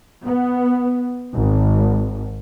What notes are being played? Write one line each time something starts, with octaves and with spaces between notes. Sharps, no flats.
B3
G#1